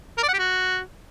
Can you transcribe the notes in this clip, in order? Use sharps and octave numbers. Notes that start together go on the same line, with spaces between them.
A#4
D5
F#5
G4
F#4